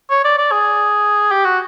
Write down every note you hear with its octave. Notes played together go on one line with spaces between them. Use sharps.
C#5
D5
D5
G#4
G4
F#4